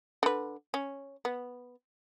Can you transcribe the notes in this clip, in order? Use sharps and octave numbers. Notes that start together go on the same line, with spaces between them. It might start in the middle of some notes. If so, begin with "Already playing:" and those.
D3 B4
C#4
B3